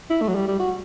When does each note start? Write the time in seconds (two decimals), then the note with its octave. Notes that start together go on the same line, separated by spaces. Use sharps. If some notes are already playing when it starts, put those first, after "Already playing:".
0.10 E4
0.22 A3
0.28 F#3
0.35 G3
0.48 G3
0.60 F#4